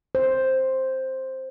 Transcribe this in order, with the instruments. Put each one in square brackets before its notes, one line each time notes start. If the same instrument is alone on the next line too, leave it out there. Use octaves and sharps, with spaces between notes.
[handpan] C5